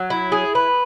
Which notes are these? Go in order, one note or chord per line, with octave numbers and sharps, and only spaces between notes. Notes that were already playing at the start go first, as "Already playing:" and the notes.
Already playing: F#3
E4
G#4
B4